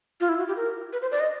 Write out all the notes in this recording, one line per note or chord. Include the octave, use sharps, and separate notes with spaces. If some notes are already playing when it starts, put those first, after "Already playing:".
F4
E4
F#4
G4
A#4
B4
C5
D5
D#5